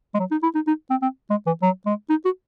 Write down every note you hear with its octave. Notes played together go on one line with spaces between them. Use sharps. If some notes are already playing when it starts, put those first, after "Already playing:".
G#3
F#3
D#4
E4
D#4
D#4
C4
C4
G#3
E3
F#3
G#3
D#4
F#4